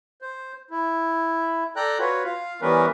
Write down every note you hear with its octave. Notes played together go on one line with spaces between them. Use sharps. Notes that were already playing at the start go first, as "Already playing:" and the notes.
C5
E4
A4 D5 G5 A#5 F#6
F4 F#4 B4 C#5
F4 F5
E3 G3 B3 C#4 A#4 B4